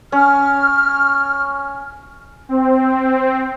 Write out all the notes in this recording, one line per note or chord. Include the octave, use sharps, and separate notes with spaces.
C#4 F6
C4